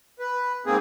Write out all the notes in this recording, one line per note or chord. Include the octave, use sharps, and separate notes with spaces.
B4
G#2 A#3 C4 G#4